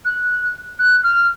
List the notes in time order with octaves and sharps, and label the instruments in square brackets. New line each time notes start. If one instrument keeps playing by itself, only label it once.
[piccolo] F#6
F#6
F6